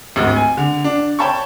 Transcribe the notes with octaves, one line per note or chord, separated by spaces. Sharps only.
G#1 D2
G#5
D3
D4
C#5 G5 A5 B5 C#6